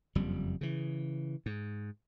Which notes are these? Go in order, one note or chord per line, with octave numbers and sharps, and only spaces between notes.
F#1 F2 G3
C#3 E3
G#2